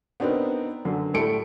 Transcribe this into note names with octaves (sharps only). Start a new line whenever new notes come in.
B3 C4 D4 D#4 A#4 B4
F#2 D3 F#3
A2 G3 A3 A4 C#7 D7